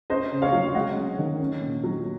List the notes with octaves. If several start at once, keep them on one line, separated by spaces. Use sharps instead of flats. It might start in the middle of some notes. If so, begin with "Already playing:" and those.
C#4 C5 D#5
C#3
C#5 F5
F#3
G#3 D#5 F#5
C#4
D#3
C#4
A#2
F#3